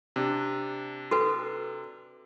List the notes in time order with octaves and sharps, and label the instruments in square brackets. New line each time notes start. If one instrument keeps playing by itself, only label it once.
[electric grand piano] C3 D4
[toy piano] F#4 A4 B4